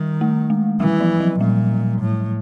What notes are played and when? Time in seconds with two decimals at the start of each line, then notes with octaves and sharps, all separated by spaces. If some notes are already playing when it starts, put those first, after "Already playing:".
Already playing: D#3 G3
0.21 A3
0.50 G#3
0.80 E3 G3
1.00 F3
1.20 F#3
1.40 A#2 G3
2.01 A2